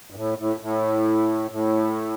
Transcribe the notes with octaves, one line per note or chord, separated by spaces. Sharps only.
G2
A2
A2
A2
A2